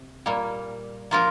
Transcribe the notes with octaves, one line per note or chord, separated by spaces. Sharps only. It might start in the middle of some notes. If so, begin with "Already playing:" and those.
Already playing: C3
A#2 G3 A#3
F3 A#3 F4 A#4